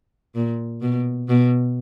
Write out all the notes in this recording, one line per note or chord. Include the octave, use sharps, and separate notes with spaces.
A#2
B2
B2